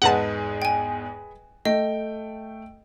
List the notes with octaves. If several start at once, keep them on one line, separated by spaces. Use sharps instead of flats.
E2 G#2 G#3 G#4 B4 F#5 A5
G5 G#5
A3 D#5 G5